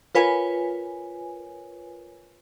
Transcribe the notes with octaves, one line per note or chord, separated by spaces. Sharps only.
F4 A#4 B4 C#5 G#5